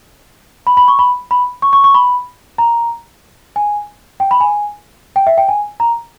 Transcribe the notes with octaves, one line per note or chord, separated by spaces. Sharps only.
B5
B5
C#6
B5
B5
C#6
C#6
C#6
B5
A#5
G#5
G5
B5
G#5
G5
E5
G5
G#5
A#5